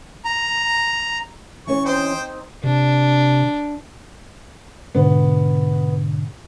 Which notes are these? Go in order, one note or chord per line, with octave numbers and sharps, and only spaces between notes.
A#5
E3 C#4 C#5 C#6
C4 D#4 C5 G5
C3 D4
G#2 B2 D3 B3